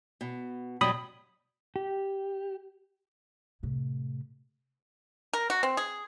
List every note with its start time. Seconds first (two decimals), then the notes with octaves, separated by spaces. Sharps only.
0.21 B2
0.81 B2 F#3 G3 B5 D#6
1.76 G4
3.63 A2 C3
5.33 A#4
5.50 F#4
5.63 C4
5.77 G#4